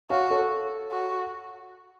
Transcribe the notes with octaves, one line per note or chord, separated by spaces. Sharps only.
F#4 C#5 F5
A4 C#5
F#4